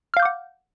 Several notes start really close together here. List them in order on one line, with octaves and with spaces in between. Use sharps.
F6 F5 G6 D6 F#5